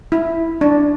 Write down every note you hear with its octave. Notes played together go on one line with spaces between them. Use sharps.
E4
D4